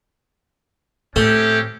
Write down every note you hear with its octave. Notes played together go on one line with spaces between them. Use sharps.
A2 A3 C4 C#4 G4 A4